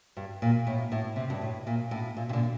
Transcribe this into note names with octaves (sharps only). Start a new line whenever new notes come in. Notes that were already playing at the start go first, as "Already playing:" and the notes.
G2
A#2
A2
A2
C3
G2
A2
A#2
A2
A#2
C3
A#2 D3